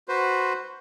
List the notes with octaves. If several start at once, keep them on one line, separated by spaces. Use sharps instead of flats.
F#4 B4 C5